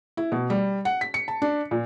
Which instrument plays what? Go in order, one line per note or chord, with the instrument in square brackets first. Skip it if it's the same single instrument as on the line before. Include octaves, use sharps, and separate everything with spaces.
[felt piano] E4
B2
G3
F#5
B6
C#7
A5
D4
A#2